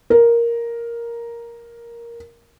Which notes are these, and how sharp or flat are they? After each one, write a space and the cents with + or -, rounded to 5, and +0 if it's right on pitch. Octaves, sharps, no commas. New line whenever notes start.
A#4 +5